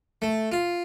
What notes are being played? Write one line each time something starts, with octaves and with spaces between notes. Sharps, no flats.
A3
F4